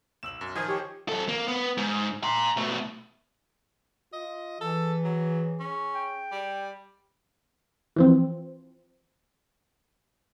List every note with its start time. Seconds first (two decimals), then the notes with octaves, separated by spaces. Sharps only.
0.23 B1 E6 E7 F#7
0.41 F#2
0.55 D#3 F3 G#4 C5 G#5 D#6 F6
0.68 G4 C#5
1.09 F#2 A4
1.29 A#3
1.48 B3
1.77 G#2
2.24 A#5 C6
2.57 B2 A3
4.13 F4 D#5
4.60 E3 G#4 A4
5.04 F#3
5.59 C#4
5.94 G5
6.32 G3
7.96 E3 F3 C4